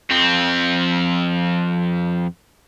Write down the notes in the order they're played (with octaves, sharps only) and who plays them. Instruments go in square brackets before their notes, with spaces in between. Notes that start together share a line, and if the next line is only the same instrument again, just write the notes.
[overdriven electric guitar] F2 C4